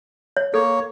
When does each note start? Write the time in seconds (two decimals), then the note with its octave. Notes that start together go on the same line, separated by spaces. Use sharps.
0.37 C#5
0.54 A#3 A4 C#5